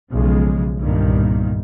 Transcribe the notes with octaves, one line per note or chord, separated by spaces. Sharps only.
B1 C#3 F3 G#3
G1 C2 G2 A#2 D#3